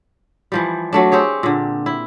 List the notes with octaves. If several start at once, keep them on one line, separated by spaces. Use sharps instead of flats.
E3 F3 G3
F#3 A3 D4
C4 G4 G#4 C#5
A#2 D3
E4